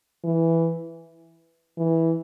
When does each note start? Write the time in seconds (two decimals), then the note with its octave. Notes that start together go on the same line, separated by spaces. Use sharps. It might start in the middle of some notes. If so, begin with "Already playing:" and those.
0.24 E3
1.78 E3